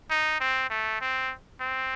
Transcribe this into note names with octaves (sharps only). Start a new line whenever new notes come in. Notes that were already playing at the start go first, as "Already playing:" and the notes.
D#4
C4
A3
C4
C4